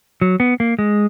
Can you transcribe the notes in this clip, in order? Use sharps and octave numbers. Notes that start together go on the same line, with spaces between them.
F#3
B3
A#3
G#3